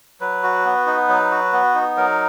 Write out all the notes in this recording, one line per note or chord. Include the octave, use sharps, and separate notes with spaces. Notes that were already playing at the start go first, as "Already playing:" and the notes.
F#3 B4
F#4
B3
D#4
F#3
F#4
B3
D#4
F#3 A#4